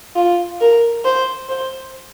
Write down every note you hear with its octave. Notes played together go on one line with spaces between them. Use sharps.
F4
A#4
C5
C5